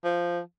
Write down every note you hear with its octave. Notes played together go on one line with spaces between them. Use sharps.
F3